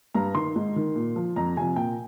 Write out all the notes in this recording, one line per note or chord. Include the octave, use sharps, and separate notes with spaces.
G2 A#5
D#3 C6
G#2
D#3
A#2
F3
F2 A#5
C3 F3 G#5
A#2 G5